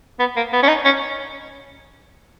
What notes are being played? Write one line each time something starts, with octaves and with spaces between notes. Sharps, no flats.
B3
A#3
B3
C#4
D#4
C#4